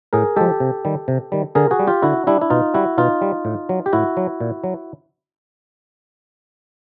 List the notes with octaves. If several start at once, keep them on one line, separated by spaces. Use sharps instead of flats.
A2 G#4 A#4
F3 G#3 G4 A4
C3
D#3 G3
C3
D#3 G3
D3 G#4 A#4
F#4 G#4
G3
F4 G4
D3 E4 F#4
G3 D4 E4
E4
B2 D#4 F4
G3 E4 F#4
B2 D#4 F4
G3
A2
F#3
G4
A2 E4 F#4
F#3
A#2
F#3